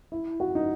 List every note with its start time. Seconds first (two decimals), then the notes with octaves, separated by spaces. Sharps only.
0.12 E4
0.40 F#4
0.55 D#4